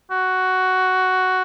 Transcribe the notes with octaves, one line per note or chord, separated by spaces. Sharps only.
F#4